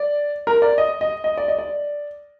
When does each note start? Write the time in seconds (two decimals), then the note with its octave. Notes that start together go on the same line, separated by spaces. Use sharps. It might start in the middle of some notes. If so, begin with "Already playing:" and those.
Already playing: D5
0.47 A#4
0.62 D5
0.78 D#5
1.01 D#5
1.24 D#5
1.37 D5
1.48 D#5
1.59 D5